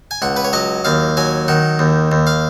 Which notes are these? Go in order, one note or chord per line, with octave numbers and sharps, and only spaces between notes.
G#5
C#2 F#5
B4
C#5
F#3 D#5
D#2 F5
F#3 G#5
D#3 F#5
D#2
D#2
F5